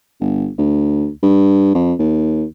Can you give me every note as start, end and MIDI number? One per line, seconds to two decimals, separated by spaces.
0.21 0.50 31
0.58 1.09 38
1.23 1.70 43
1.75 1.94 41
1.99 2.45 39